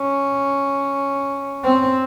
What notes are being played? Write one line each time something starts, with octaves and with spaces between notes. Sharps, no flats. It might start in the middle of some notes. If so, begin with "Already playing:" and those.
Already playing: C#4
C4